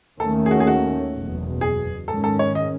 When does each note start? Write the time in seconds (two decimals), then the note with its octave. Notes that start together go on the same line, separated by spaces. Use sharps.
0.20 D#2 D#3 A3 C#4 A4
0.46 G#4
0.51 F#4
0.60 G#4
0.67 F#4
1.14 F#1 E2 B2
1.61 G#4
2.08 G#2 D#3 G#3 C#4 A4
2.24 A4
2.39 C#5
2.55 D#5